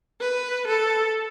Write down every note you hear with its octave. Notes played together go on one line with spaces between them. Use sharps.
B4
A4